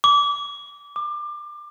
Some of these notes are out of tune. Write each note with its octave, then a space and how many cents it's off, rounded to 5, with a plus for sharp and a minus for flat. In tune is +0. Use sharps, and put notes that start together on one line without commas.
D6 -25
D6 +25